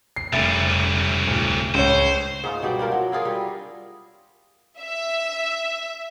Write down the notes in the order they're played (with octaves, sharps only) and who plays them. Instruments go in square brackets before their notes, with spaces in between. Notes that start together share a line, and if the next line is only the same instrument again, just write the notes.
[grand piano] C7
[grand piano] F1 E5 A6 [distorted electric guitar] C2 C#3
[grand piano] D1
[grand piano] C#2 C#5 [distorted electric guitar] C5
[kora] G#2 C#4 D#4 F4
B2 G3 D#4 D5
D4 F4 A#4
F#3
E4 F4 G#4 A#4
G3
[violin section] E5